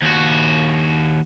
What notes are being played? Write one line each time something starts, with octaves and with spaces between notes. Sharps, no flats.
D#2 F#4